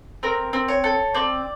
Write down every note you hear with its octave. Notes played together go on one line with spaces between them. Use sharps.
C4 A#4
C4
C#5
A4
C4 D5